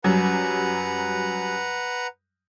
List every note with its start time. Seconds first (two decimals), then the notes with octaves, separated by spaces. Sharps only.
0.04 F#2 F#3 G3 B4 F#5 A#5